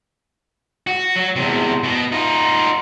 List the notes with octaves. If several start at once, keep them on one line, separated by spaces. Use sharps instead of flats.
F#4
F#3
E2 C3
B2
D#4 F4